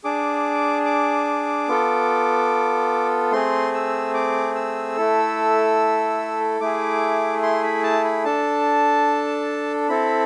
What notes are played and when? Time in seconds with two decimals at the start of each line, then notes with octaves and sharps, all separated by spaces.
0.04 D4 G#4 D6
0.85 D6
1.68 B3 F4 A4
3.32 A3 C4 G#4 C6
3.74 E6
4.14 D6
4.55 E6
4.96 A3 E4 A4
6.61 A3 E4 G#4 D6
7.43 C6
7.63 B5
7.83 A5
8.05 B5
8.25 D4 A4 A5
9.89 C4 E4 A4 B5